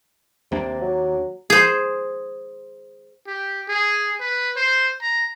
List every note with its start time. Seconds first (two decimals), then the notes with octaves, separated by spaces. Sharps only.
0.52 D#2 C3 A#3 D4
0.82 F#3
1.50 G#4 C5
3.27 G4
3.68 G#4
4.20 B4
4.56 C5
5.02 A#5